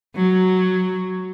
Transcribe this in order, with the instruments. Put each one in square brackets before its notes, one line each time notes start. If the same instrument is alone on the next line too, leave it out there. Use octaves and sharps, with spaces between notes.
[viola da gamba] F#3